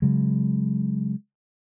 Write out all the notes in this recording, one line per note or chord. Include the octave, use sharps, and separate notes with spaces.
C#3 F#3 G#3